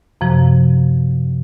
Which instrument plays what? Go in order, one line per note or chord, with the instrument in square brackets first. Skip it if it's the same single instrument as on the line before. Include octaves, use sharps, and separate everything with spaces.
[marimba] F#2 C3 F3